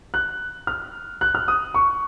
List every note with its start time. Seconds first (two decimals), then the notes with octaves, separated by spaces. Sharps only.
0.14 F#6
0.67 F6
1.21 F#6
1.35 F6
1.48 D#6
1.74 C#6